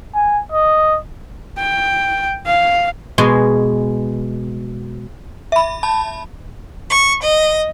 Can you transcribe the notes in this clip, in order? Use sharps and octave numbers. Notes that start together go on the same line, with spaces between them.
G#5
D#5
G5
F5
B2 G#3 G#5 C6
E5 B5
A5 B5
C#6
D#5